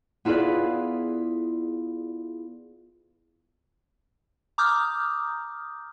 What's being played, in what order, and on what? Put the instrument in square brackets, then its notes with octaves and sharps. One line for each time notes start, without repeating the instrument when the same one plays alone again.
[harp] B3 E4 F4 G#4 B4 D5
[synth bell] A#5 D6 D#6 F6 G6